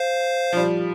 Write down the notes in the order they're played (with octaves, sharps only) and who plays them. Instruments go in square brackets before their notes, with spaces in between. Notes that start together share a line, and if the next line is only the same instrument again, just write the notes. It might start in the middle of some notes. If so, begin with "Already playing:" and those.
Already playing: [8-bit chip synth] C5 F5
[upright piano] F3
G3